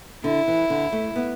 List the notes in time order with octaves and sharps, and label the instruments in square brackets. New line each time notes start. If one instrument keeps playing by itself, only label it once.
[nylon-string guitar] D3 [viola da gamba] E4
[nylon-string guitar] E3
D3
A3
B3